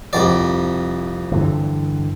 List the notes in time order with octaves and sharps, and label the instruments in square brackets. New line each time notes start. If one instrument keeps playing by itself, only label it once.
[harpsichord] C2 F2 D5
[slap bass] G2 D3 E3